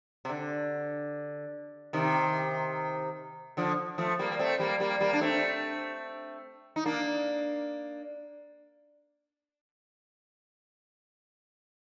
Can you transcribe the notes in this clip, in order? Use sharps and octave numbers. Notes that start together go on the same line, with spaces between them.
C3
D3
C3 D#3
D3 F3
F3 A3
G3 A#3
A#3
A3 C4
G3 A#3
G3 A#3
G3 A#3
D4
A3 C4
D#4
A#3 D4